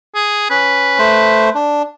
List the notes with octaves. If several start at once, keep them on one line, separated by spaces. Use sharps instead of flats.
G#4
C#4 B4
A3 C5
D4